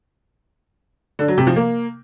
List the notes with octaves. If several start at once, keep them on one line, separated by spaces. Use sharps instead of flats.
D3
F#3
C3
F3
A#3